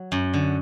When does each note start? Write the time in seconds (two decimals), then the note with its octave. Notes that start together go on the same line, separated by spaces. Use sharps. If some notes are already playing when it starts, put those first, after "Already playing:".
Already playing: F#3
0.12 F#2
0.34 D3